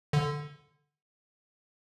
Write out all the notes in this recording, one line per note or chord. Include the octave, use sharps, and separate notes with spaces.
D3